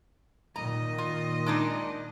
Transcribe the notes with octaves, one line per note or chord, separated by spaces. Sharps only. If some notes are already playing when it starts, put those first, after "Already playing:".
A#2 D#3 D#5 A#5
F4
G#3 D4 D#4